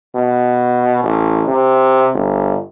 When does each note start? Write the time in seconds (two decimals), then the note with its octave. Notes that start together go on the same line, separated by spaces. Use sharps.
0.15 B2
1.04 A1
1.48 C3
2.14 G1